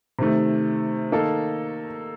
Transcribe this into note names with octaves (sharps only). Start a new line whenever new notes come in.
C3 D#3 A3
D#3 A#3 D#4 A4